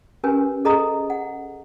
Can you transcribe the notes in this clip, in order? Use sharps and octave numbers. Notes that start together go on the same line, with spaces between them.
C#4 G4 A#4 B4 G#5
G#4 A4 D#5 A#5 D#6
F#5